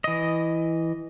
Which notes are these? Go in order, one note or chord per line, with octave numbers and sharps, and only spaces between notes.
E3 D#5